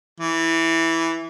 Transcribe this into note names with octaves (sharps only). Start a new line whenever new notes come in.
E3